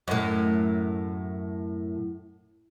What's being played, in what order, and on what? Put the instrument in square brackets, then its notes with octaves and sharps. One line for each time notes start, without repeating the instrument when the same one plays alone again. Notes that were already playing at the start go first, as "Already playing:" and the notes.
[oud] F#2 A2